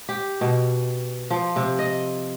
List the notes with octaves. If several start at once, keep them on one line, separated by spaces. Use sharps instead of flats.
G4
B2
F3
C3
D#5